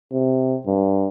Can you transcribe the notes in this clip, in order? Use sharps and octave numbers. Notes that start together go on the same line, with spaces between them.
C3
G2